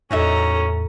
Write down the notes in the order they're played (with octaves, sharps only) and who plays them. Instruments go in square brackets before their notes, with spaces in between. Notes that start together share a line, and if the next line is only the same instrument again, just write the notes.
[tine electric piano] E2 A2 [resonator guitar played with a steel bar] F#3 D#4 E5 [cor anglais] C#4 [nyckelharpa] A4 A#5